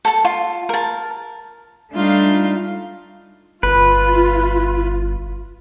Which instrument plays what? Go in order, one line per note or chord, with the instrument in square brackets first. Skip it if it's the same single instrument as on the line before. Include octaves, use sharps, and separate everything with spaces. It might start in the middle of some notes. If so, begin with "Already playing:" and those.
[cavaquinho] A4 A5
F4
A#4 A5
[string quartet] G3 A3 D4 D#4 F4 F5
[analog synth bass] G1 [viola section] F4 [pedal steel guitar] B4